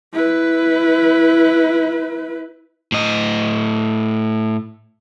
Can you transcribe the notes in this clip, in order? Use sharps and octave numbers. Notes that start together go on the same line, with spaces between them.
E4 B4
A2 D#5